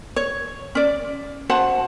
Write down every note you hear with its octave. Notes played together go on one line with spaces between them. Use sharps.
C#5
C#4 D5
F#4 C5 F#5 A5